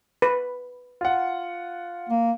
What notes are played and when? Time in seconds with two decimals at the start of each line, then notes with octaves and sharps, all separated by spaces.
0.22 B4
1.01 F4 F#5
2.09 A#3